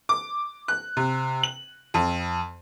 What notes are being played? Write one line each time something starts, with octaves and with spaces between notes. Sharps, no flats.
D6
F#6
C3
F#7
F2